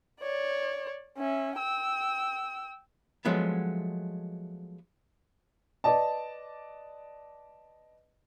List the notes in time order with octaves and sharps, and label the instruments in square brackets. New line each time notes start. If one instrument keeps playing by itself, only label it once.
[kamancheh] C#5 D5
C#4 E5
G5 E6
[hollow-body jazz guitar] F3 F#3 G#3 A3 B3
[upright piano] B4 D5 D#5 A5